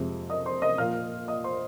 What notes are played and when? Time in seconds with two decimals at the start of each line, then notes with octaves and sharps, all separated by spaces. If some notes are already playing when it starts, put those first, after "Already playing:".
Already playing: F2 C3 G#3
0.30 D#5 D#6
0.45 C5 C6
0.62 D#5 D#6
0.78 A#2 F3 A#3 F5 F6
1.28 D#5 D#6
1.44 C5 C6